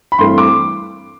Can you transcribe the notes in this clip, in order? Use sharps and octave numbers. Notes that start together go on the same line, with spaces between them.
B5
G2 E3 A3 C4 C6
D6